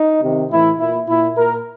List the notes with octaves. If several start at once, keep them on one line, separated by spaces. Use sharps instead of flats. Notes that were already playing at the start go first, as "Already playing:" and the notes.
Already playing: D#4
C3 D#3
A2 E3 E4
A#2 E4
A#2 E4
A#2 A#4